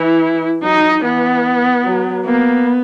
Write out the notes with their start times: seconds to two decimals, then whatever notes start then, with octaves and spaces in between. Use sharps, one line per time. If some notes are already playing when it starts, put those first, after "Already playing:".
Already playing: E3 E4
0.62 F#3 D#4
1.03 E3 B3
1.85 F#3
2.25 A#3 B3